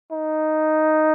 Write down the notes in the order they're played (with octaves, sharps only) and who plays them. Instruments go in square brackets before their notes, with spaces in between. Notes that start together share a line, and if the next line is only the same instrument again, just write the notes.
[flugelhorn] D#4